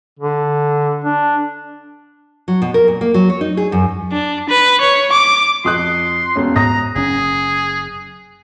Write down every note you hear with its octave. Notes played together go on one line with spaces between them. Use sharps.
D3
D4
F#3
B2
A#4
A#2
A#3
F#3
C#5
D#4
G#4
F#2
D4
B4
C#5
D6
F2 C6 D#6 F#6
E1 C#4
G#2 A#5 D#6 A#6
F#1 C#4 G#4